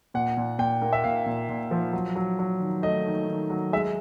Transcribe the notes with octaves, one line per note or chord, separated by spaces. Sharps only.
A#2 F#5
A#2
A#2 G5
A#3
E5
A#2 F5
A#2
A#2
F3
F#3
F#3
F#3
D#3
A3 D#5
D#3
D#3
F#3
G#3 E5